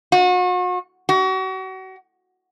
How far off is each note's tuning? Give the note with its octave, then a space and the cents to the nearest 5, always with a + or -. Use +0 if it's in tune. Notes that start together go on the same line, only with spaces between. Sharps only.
F#4 -40
F#4 +35